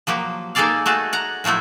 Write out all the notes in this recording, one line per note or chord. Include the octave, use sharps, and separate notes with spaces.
F3 F#3 A#3 G4
A#3 D#4 G#4 A4 D5 F5
A3 F#4 G#4 A5
F#5 A#5
A2 F3 F#3 A3 E4